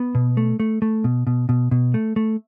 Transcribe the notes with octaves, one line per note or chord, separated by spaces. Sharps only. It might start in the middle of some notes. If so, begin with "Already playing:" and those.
Already playing: B3
B2
A3
A3
A3
B2
B2
B2
B2
A3
A3